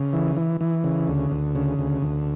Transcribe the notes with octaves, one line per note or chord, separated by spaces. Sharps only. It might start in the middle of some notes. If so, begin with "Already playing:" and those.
Already playing: C#3
E3
E3
E3
C#3
D2
D2
C#3
D2
D2